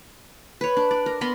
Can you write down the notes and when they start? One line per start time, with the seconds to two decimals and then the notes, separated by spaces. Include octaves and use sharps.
0.61 B4 C#5
0.77 D4
0.91 D5
1.06 A#4
1.21 B3 A#4 B5 C6